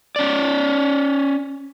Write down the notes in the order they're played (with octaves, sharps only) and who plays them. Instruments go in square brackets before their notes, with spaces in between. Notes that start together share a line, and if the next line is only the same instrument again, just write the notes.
[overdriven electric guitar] C#4 D5